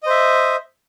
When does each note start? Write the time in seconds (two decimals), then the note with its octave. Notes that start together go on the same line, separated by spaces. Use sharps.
0.03 D#5
0.06 C5
0.10 E5